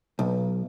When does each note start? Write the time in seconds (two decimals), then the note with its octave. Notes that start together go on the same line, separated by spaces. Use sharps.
0.19 B1